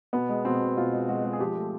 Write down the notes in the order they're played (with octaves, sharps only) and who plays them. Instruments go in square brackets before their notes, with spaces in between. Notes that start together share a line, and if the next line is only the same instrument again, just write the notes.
[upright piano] B2 B3
G#3
B2 C4
B2
B2 F4
G#3
G#3 F#4
G#3
G#4
F3 G4
A3